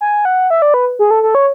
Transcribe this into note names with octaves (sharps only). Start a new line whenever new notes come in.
G#5
F#5
E5
D5
B4
G#4
A4
A4
C#5